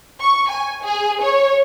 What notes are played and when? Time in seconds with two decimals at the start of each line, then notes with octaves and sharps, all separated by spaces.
0.20 C#6
0.50 G#5
0.83 G#4
1.22 C#5